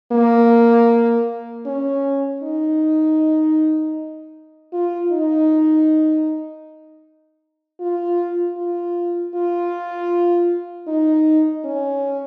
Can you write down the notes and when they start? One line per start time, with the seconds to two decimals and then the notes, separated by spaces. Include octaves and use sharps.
0.12 A#3
1.66 C#4
2.43 D#4
4.73 F4
5.12 D#4
7.81 F4
8.58 F4
9.35 F4
10.88 D#4
11.65 C#4